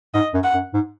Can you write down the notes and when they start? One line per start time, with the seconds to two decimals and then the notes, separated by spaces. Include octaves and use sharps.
0.14 G#2 D#5
0.34 F#2
0.44 F#5
0.54 F#2
0.73 G#2